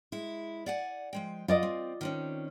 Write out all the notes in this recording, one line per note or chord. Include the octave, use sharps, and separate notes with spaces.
G#3 E4
D5 F#5 G#5
F3 G#3 G5
F#3 F4 D5 D#5
C4
D#3 C4 C#4